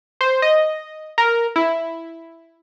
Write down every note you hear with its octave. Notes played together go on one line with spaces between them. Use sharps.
C5
D#5
A#4
E4